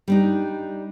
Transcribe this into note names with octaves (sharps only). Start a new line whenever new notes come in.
G3 D4 D#4